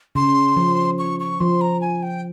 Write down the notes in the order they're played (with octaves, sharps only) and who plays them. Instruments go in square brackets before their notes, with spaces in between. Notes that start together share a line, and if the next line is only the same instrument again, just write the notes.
[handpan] C#3 [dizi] C6
[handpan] F3
[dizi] C#6
C#6
[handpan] F3 [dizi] C6
[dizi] A#5
G#5
G5